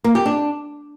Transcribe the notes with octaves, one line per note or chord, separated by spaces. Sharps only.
A#3
G4
D4